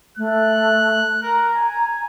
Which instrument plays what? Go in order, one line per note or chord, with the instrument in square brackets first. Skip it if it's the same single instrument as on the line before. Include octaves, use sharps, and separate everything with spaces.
[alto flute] A3 [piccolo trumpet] F#6
[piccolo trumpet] A#4 [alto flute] A#5
[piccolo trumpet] G#5